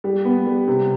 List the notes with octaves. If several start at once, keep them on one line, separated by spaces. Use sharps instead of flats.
G3
B3
G3
C3